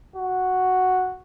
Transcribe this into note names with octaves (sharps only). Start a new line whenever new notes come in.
F#4